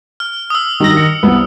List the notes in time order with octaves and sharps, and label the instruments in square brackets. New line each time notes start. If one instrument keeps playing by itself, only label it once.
[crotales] F6
D#6 E6
[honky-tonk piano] G2 F#3 G3 [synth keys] D#3 A#6
[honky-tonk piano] C#7
[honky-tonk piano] C2 G3 C4 [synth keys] B3